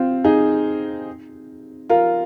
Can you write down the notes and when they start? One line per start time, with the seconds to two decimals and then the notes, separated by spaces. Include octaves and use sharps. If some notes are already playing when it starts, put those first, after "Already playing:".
Already playing: C4 F4
0.24 D#4 G#4
1.89 F4 A#4